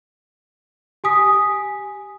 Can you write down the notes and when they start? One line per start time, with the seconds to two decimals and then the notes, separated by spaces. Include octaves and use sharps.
1.04 G4 G#5 D#6 B6